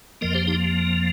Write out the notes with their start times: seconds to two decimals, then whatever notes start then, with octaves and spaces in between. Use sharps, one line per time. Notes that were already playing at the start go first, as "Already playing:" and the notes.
0.21 F2 F3 A#3 A#4 D#5
0.34 G4 C5
0.47 D#4 G4